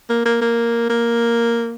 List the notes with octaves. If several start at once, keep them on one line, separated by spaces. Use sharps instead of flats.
A#3
A#3
A#3
A#3